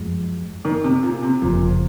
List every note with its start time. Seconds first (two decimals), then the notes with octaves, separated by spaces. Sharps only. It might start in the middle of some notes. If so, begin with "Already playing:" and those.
Already playing: F#2 F3 G#3
0.65 D#3
0.84 C3
1.03 A#2
1.22 C3
1.42 F#1 F2 A#2 C#3 F3